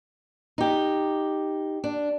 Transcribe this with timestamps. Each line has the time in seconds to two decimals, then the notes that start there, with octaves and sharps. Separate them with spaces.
0.58 D#4 G4
1.84 D4